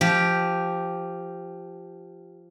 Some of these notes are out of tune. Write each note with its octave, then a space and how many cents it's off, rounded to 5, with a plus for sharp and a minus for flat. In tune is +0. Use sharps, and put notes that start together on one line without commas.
F3 -10 G4 +0